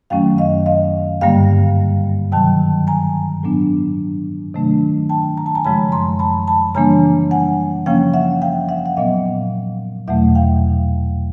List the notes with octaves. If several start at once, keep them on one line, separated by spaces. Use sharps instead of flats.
F#2 D#3 F#3 A3 C#4 F5 G5
D#5 F5
D#5 F5
G2 D3 G3 A#3 F5 G5
C3 D#3 F#3 G5 A5
G#5 A#5
A2 F#3 B3 D4
C3 D#3 F#3 A3 D4
G5 A5
A#5
A5
G#5 A#5
F#2 C#3 F3 G#3 A5 B5
A#5 C6
A5 B5
A5 B5
C#3 E3 G3 A#3 D4 G#5 A#5
F#5 G#5
C#3 F3 A#3 C#4 F5 G5
E5 F#5
F5 G5
E5 F#5
F#5
A#2 F#3 B3 D#5 F5
E2 B2 F#3 A3 E5 F#5
F5 G5